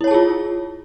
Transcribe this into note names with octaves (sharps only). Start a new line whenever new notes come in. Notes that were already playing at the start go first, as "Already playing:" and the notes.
E4 F4 G#4 C#5 A5